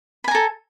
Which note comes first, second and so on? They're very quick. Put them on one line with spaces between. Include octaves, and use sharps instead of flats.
B5 G#5 A#5 A4